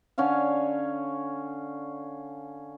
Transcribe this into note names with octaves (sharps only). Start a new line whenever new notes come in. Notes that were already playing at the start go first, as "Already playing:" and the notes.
D3 C#4 C#5 F5